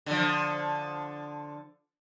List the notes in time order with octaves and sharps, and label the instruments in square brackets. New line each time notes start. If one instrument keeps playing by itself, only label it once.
[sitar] D3 F3